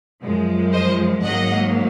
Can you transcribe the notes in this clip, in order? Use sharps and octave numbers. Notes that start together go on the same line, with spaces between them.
F#2 F3 G#3
C5 D#5
G#1 G#2 F#3 A#3 D#5 F#5